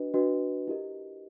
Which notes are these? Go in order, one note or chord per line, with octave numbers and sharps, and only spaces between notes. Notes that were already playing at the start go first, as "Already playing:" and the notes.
Already playing: D4 F#4 B4 D#5
D4 F#4 B4 D#5
E4 G4 A#4 D#5